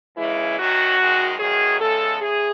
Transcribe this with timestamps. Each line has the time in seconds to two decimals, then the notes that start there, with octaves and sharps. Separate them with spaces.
0.16 D#2 C#3 E3 G#3 E4
0.58 F#2 D#3 F#3 F#4
0.98 F#2 D#3 G#3
1.39 E2 D#3 F#3 G#4
1.80 E2 C#3 G#3 A4
2.21 A2 G#4